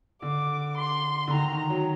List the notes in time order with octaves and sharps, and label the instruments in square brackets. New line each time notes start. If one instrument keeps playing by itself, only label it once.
[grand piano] D3 [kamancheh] D6
[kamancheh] C6
[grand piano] D3
[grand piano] D#3 [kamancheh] A#5
[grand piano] D#3
F#3